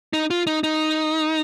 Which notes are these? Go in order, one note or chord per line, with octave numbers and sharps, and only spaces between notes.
D#4
F4
D#4
D#4